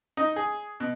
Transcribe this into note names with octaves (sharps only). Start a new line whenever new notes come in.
D#4
G#4
B2